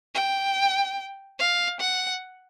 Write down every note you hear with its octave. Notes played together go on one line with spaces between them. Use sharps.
G5
F5
F#5